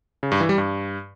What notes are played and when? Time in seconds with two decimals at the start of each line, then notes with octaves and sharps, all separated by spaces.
0.23 C#3
0.32 G2
0.40 E3
0.49 G3
0.58 G2